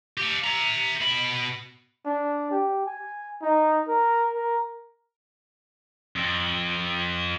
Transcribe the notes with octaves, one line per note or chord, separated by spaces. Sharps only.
G4 F5
E5 A#5
B2 B5
D4
G4
G#5
D#4
A#4
A#4
F2